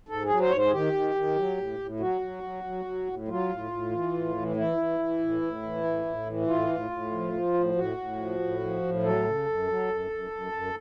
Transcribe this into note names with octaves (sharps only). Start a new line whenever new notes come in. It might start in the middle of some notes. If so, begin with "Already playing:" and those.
G#2 A4
G#4
F#3
C5
G#2 C#5
C5
G#4
D#3 G4
D#3
D#3
F#3
A2
A2
F#3 F#4
F#3
F#3
F#3
F#3
A2
F#3 F4
A2
A2
E3
A2
E3
E3 E4
E3
E3
A2
A2
E3
A2
A2
E3
A2 F4
A2
A2
F3
F3
A2
A2 F#4
A2
F3
A2
F3
A2
F#3 A4
C#3
F#2
F#3
F#2
F#2
F#2
F#2